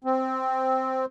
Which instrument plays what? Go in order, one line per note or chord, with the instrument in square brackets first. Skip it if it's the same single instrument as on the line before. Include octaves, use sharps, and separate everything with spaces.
[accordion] C4